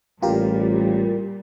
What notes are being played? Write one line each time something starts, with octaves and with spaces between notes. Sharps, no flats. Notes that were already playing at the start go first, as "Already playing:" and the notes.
A1 A#2 G3 F4 G4 A#4